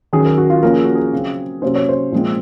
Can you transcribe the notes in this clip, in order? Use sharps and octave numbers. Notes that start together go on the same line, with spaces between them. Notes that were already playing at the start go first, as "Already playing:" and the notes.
D#3 F#3 C#4 G#4
A#4
F#4
F4
F3 A#3 C#4 A#4
G#4
F#4
G#4
C#3 F#3 C4
C3 F#3 A#3 C#4 C5
C#5
C5
A#2 F3 G#3 C4